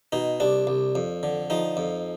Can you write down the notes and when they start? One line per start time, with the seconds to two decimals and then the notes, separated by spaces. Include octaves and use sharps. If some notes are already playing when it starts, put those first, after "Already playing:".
0.12 B2 D#4
0.40 C2 D4
0.67 C2
0.95 F2
1.23 D3
1.50 F3 D#4
1.77 F2